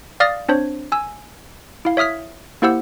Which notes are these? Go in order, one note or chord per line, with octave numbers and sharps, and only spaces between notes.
D5 F5 D#6 F6 A6 A#6
C4 D4 C5 C#5
G#5 E6
E4 F5
C#5 E5 D#6 F6 B6
A#3 E4 G4 C5 F#5 E6